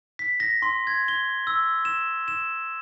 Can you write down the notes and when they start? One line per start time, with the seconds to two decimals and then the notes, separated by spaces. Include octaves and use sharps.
0.19 B6
0.40 A#6
0.62 C6
0.87 G#6
1.08 G7
1.47 E6
1.85 E7
2.28 E7